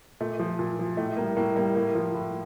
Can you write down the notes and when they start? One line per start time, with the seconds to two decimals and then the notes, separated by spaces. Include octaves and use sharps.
0.20 A#2 A3
0.39 F3
0.59 A#2
0.79 F3
0.97 A2 A3
1.17 G3 A#3
1.37 A2 A#3
1.56 G3 A#3
1.75 A2 A#3
1.95 F3
2.14 A2